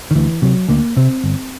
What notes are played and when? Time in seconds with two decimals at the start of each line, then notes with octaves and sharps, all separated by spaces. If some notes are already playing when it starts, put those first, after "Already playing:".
0.11 D#3
0.15 D2 E3
0.42 C3 F#3
0.69 D2 A#3
0.97 C3 C4
1.24 G1